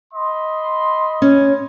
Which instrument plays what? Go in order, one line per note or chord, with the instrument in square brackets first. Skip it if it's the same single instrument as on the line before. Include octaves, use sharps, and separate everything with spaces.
[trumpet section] D#5 B5 C6
[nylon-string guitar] C#4